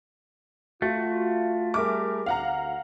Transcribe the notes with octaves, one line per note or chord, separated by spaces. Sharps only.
A3 F4 F#4
G3 G#4 A#4 E5 D6
D2 F5 F#5 A#5